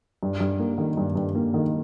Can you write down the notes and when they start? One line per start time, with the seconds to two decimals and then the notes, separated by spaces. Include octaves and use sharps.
0.23 G2
0.40 G2
0.59 A#3
0.78 D#3
0.97 G2
1.15 G2
1.35 A#3
1.54 D#3